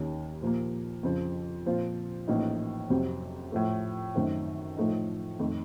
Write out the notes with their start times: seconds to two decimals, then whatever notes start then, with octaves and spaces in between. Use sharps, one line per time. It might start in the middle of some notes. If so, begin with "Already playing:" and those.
Already playing: D#2 D#3 A#3 C#4
0.42 A#2 F3 A#3
1.03 F2 C#3 F3
1.66 A#2 F3 C4 F4
2.28 A1 A2 F3 A#3 D#4
2.90 F2 C3 F#3 C4
3.52 A2 F3 A3
4.15 F#2 D#3 A3 C4
4.77 A2 F3 A3 D#4
5.39 F2 D#3 A3